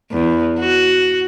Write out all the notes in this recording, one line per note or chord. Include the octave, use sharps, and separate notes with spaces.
E2
F#4